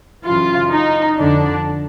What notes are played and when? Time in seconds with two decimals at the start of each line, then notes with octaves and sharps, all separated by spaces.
0.25 F#2 C#3 E3 F4
0.72 D#4
1.18 F2 D3 D4